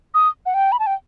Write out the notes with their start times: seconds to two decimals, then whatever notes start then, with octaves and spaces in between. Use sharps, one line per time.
0.14 D#6
0.46 F#5
0.54 G5
0.72 B5
0.79 A5
0.87 G5